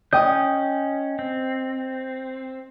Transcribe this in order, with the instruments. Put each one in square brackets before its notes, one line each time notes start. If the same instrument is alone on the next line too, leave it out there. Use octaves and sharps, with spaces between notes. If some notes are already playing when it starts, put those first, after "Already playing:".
[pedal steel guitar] C#4 G6 [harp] D#5 G5 D#6
[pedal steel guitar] C4